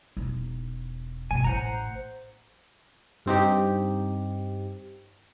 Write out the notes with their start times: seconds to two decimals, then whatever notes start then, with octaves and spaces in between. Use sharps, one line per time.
0.17 E1 D#4
1.31 F#2 B2 G#5
1.44 A1 A2 C5 F#5 A#5
3.26 G2 C4 D#4 G4